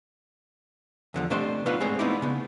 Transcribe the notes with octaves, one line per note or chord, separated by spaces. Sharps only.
E2 D3 F3
C3 A3 D4 C5 D#5
A3 B3 D4 D#4 F4 B4
G#3 A3 C4 G#4 C5 C#5
A3 B3 C4 D#4 E4 D5
C#3 B3